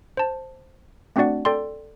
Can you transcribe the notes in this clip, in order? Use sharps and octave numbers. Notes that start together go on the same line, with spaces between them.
C5 A5
A3 C4 D4 F#4 D5 F#5
A4 D5 G5 C6